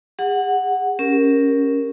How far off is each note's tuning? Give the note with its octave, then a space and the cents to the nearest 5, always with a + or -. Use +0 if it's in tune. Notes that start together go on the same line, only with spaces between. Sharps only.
G#4 -45 F#5 +0
C#4 +0 G4 +20 A#4 +0